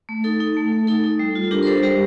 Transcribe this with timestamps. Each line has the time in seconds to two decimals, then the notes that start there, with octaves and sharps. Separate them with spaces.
0.09 A3
0.24 D#4 A4
0.40 D#4
0.57 A3
0.72 A3
0.87 D#4 A4
1.04 D#4
1.19 G3
1.35 F4
1.51 D4 G4 A#4
1.63 A#4
1.66 G3 A4 C5
1.83 G3 G4 A#4